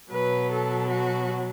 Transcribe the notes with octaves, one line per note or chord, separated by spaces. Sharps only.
B2 F#3 B4
A4
F#4